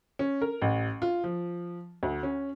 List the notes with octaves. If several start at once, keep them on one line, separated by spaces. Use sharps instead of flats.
C#4
A#4
A1
F4
F3
D2
C#4